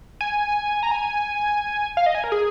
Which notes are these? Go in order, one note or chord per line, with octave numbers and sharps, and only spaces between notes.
G#5
A#5
G#5
F5
D#5
G#5
A#4
G#4